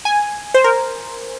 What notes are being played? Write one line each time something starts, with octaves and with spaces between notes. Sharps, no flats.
G#5
C5
A#4